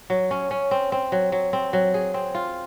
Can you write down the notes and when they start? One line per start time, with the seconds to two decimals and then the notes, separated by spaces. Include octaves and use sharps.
0.10 F#3
0.31 C#4
0.51 C#4
0.71 C4
0.92 C4
1.12 F#3
1.32 F#3
1.53 C4
1.73 F#3
1.94 G#4
2.14 C4
2.35 F4